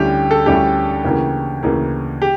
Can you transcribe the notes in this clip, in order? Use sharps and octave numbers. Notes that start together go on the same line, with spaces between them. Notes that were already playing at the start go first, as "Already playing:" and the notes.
Already playing: D2 D3 G3 C#4 E4 G4
A4
D2 D3 G3 C#4 E4 G4
D2 C#3 E3 A#3
D2 C#3 E3 A#3
G4